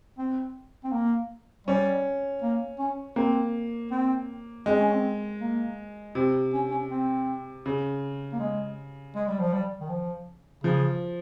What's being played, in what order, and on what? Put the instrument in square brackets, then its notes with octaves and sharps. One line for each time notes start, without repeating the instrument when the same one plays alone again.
[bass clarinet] C4
C4
A#3
[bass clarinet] G3 [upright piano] C#4
[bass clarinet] A#3
C#4
[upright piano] A#3 [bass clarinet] C4
[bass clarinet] C4
[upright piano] G#3 [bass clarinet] C4
[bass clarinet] C#4
C4
A#3
[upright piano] C3 [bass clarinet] C4
[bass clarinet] C#4
C#4
C4
[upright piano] C#3
[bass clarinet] A#3
G#3
G#3
G3
F3
G3
D#3
F3
[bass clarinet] C#3 [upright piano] F3